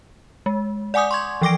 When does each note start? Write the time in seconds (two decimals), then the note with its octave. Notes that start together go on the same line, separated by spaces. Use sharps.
0.46 G#3
0.94 D5 F#5 G#5 D6 D#6 G6
1.11 C6 C#6 G#6
1.42 E3 F3 G5 D6 A#6 D7